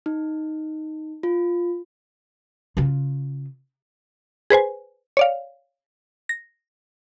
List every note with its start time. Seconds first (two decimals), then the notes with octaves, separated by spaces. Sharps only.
0.06 D#4
1.23 F4
2.77 C#3 F4
4.50 G#4 B4 C5 G#5
5.17 C#5 D5 F5
6.29 A#6